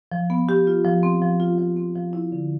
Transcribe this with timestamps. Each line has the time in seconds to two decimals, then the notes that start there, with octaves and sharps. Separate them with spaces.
0.12 F3
0.30 B3
0.49 G4
0.67 F4
0.85 F3
1.03 C4
1.22 F3
1.40 F4
1.58 F3
1.77 C4
1.96 F3
2.13 E4
2.32 D3